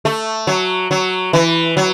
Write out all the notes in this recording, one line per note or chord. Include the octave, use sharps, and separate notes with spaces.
A3
F#3
F#3
E3
F#3